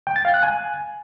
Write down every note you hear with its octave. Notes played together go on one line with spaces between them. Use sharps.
G5
A6
F5
F#6
G#5